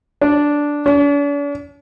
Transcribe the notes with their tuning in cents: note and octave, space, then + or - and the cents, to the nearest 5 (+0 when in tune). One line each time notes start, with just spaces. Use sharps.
D4 -5
D4 -45